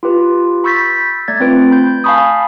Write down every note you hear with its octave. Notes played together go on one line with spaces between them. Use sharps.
F4 G4 B4
B5 C#6 E6 G6 A6 B6
A3 D5 G#6 A6
A3 C4 F4 B4 D7
B5 G6
F5 G#5 A5 B5 C#6 D#6